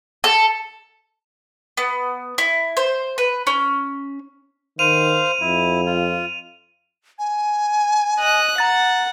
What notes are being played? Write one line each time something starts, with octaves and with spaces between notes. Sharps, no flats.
A4
B3
E4
C5
B4
C#4
D#3 C5 F5 D#7 F7
F2 E4
F4
G#5
D#5 F#6
F#5 A#5 A6